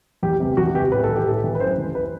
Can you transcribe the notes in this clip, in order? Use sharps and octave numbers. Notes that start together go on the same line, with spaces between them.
E2 G4
C3 E3
E2 F#4
C3 E3 G4
A2 B4
A4
E3
G4
A2 A4
E3
B4
F#2 C5
E3
B4